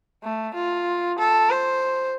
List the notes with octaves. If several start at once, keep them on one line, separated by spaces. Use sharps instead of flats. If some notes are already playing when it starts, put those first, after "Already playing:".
A3
F4
A4
C5